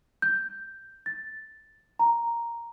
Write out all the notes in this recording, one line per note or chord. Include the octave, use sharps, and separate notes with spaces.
G6
A6
A#5